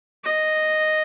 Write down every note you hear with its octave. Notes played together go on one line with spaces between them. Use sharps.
D#5